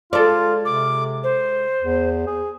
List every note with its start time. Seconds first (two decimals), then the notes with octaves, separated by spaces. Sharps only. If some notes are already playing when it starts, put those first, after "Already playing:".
0.13 G#3 F4 A4 D5
0.65 C3 D6
1.24 C5
1.83 E2
2.27 G#4